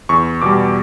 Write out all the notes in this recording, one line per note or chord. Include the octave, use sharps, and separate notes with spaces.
E2 C#6
B2 G3 D6